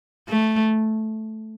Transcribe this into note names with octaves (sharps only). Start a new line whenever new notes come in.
A3